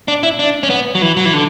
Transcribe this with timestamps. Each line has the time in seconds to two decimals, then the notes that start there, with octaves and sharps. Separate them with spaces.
0.08 D4
0.23 E4
0.39 D4
0.63 C#4
0.70 B3
0.95 F#3
1.02 E3
1.17 F#3
1.25 E3
1.33 D3